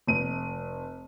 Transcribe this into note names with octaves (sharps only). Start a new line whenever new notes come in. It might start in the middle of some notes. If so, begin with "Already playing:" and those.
F1 D#7